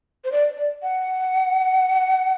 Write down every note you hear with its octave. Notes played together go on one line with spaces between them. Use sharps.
C5
D5
D5
F#5